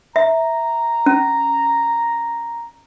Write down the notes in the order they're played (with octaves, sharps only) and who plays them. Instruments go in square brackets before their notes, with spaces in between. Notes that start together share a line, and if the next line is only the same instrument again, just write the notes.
[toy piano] E5 [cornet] A#5
[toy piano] C#4